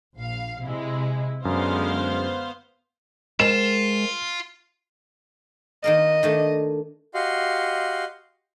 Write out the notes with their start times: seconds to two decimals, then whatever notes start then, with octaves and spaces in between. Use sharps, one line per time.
0.17 A#1 F5
0.62 C3 G#3 E4
1.45 F#2 D3 G#3 B3 C5 F5
3.40 G#3 F4 A#4 C5 G5 E7
5.84 D#3 A#3 A#4 D#5
6.23 D#3 A3 D4
7.14 F#4 G4 D#5 F5 C6